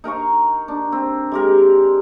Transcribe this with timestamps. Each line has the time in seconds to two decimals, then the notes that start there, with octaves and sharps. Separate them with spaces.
0.04 D#4 A#4 A#5 C#6
0.68 D4
0.92 C4
1.32 G#3 G4 A#4